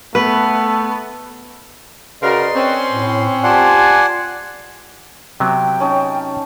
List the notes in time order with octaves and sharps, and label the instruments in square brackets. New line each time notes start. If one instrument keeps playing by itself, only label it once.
[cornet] A3 [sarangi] B3 [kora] B4
[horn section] C#3 F#4 A#4 [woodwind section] B4 D5 D#5 [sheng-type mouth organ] C6
[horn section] C4 C#4
[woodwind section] A2
[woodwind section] F4 G4 A5 [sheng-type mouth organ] D5 F#5 C6 [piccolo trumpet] G#5
[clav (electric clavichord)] C3 F#3 B3 [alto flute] G5
[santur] C#4 D#4 A5